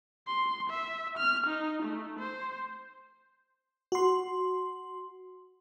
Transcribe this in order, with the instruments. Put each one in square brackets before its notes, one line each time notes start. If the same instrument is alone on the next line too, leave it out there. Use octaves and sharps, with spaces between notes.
[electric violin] C6
E5
F6
D#4
A3
C5
[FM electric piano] F#4 C6